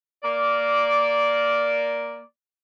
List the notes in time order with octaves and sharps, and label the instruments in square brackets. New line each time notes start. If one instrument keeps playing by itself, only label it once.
[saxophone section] A#3 D5